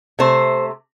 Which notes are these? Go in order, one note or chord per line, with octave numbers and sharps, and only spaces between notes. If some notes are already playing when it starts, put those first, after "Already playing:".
C3 A3 C5